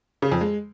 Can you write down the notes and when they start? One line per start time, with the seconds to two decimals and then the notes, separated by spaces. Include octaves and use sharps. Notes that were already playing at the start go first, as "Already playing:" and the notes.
0.22 C#3
0.32 F2
0.41 G#3